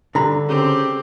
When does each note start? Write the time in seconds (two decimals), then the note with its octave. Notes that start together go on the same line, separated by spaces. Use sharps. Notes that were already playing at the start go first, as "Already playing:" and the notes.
0.15 G2 D3 A#5 B5
0.49 C#3 C4 G4